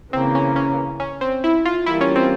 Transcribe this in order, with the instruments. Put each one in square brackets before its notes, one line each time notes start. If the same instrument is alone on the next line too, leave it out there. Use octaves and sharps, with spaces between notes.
[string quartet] C#3 E3 A#3 [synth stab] C4
[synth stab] C#4
C#4
C#4
C4
E4
F4
[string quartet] E3 G3 A#3 F4 [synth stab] E4
[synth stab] C#4
C4